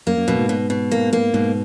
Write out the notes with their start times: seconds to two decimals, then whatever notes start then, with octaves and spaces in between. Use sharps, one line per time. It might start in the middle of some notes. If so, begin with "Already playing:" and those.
0.07 F#2 A#3
0.17 F#2
0.28 F#2 B2
0.38 G#2
0.49 B2
0.70 B2
0.91 A#3
1.13 A#3
1.34 G#2 B2